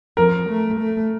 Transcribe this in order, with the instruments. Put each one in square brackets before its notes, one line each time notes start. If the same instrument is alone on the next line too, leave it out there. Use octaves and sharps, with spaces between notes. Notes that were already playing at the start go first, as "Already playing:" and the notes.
[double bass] F3 [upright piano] A#4
[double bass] A3
A3